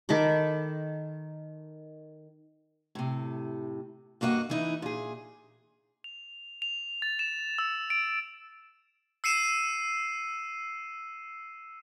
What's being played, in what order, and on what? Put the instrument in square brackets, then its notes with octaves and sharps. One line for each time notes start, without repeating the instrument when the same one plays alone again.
[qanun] D#3 A4 B5 D6
[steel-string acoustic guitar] A2 C3
G2 A#3 F#4 D#5 F#5
E3 D#4 E4
A#2 G#4
[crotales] F7
F7
A6
E7
E6
D7
E6 C7 C#7 D#7 E7